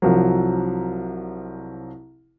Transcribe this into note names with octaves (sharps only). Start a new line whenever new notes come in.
C2 F3 F#3